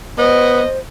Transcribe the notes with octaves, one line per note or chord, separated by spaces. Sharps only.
B3 C5 D#5